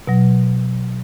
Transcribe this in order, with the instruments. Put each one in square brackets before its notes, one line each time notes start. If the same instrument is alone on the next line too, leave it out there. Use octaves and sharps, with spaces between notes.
[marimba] B2 F#3